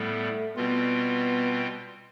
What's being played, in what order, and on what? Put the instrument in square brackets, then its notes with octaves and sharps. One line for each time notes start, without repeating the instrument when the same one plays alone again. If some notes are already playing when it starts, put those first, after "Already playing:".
Already playing: [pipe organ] A2 G3 B3 [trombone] A3
[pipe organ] B2 G3 C4 F4 [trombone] B3